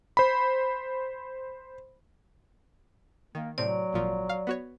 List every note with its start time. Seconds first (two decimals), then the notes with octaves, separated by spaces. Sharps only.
0.17 C5 B5
3.35 D#3 A#3
3.58 A2 C3 F#3 C4 D5
3.93 G#1 A#2 F3
4.29 F5
4.47 B3 F#4 C#5